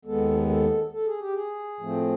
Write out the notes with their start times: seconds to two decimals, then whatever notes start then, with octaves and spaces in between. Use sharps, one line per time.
0.05 D#2 D#3 G#3 B3 A4
0.49 A4
0.92 A4
1.06 G#4
1.20 G4
1.34 G#4
1.80 A2 F3 A3 C4